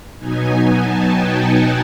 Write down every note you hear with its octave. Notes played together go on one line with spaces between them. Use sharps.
B2 F#3 B3 D#4 G#5
A5
G5
F#5